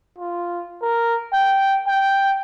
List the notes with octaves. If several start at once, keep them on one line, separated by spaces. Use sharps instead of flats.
F4
A#4
G5
G5